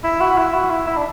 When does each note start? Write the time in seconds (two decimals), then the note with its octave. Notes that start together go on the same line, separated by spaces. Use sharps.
0.04 E4
0.21 F#4
0.37 E4
0.54 F#4
0.70 E4
0.87 E4
0.97 D4